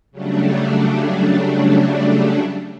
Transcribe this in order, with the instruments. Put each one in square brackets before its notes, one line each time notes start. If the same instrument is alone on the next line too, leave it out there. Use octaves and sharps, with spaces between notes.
[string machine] C#3 F#3 G3 A3 D4